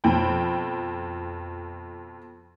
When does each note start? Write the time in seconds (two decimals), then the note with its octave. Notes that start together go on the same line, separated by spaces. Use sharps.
0.04 F2 B2 G5 B5